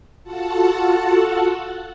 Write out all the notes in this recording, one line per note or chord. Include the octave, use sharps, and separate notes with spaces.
F4 F#4 A4 F#5 A5